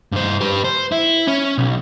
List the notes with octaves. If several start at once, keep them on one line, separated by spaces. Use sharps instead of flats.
G2 C5
G4 B4
C5
E4
C#4
B1